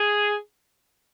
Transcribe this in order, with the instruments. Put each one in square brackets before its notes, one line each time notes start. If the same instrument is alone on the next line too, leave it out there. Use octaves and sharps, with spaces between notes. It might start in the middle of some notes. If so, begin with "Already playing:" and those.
Already playing: [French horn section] G#4